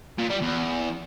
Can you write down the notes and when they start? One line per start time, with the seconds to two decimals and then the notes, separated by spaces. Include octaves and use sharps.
0.18 A#2
0.29 G3
0.41 E2